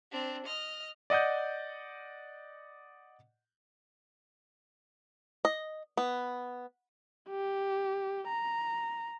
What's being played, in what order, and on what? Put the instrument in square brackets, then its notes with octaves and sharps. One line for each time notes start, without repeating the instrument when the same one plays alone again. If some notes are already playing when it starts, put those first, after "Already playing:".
[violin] C4 D4
D#5 F6
[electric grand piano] D5 D#5 F#5 D#6 G6
[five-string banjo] D#5
B3
[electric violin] G4
A#5